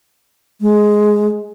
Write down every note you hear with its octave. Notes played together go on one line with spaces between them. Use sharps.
G#3